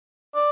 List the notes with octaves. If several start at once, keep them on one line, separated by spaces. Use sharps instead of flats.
D5